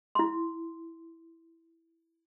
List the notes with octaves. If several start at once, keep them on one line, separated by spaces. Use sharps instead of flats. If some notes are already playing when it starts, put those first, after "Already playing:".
E4 C6